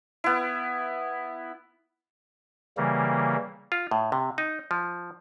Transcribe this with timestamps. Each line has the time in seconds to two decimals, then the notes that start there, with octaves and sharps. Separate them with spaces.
0.24 B3 E4
2.77 C#3 E3 G3 A#3
3.72 F4
3.91 A2
4.12 C3
4.38 D#4
4.71 F3